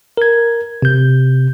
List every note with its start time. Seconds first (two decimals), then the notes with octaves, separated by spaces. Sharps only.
0.17 A#4 G#6
0.82 C3 G6